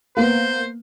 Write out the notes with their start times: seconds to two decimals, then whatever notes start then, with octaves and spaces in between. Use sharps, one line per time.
0.17 A#3 B3 C5